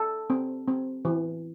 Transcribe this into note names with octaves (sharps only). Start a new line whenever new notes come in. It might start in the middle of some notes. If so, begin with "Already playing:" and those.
Already playing: A4
C4
C4
E3